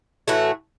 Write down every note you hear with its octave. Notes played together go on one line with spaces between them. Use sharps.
A2 E3 A3 F#4